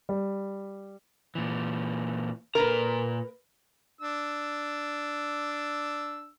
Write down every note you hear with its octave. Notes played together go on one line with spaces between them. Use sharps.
G3
A#2 E3
A#2 A#4 B4 A#5
D4 E6